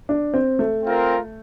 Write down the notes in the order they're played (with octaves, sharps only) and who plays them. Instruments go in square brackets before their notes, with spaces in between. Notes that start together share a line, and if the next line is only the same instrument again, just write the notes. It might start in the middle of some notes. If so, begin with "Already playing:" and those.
[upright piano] D4
C4
A3
[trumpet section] C4 F4 A#4